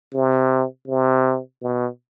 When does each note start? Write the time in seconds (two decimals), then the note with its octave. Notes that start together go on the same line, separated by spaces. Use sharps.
0.13 C3
0.88 C3
1.62 B2